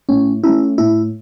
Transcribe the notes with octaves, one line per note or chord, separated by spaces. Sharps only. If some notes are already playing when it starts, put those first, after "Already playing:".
A2 C#4
A3 C#4 E4
A2 E4